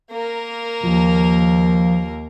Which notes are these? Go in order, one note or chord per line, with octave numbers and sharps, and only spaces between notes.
A#3 A#4
D#2 F3